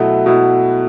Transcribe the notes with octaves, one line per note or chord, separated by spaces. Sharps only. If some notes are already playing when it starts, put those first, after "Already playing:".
Already playing: B2 F#3 A3 E4
B2 F#3 A3 E4